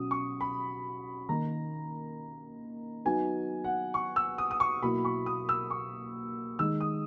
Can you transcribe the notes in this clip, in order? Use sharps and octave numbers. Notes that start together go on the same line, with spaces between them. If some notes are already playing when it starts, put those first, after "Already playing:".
Already playing: B2 F#3 C#4 D#6
C#6
B5
D#3 A#3 D#4 A#5
F#3 B3 D#4 G#5
F#5
C#6
E6
D#6
D#6
C#6
B2 F#3 A#3 E4 B5
C#6
D#6
E6
C#6
D#3 G#3 D#4 E6
D#6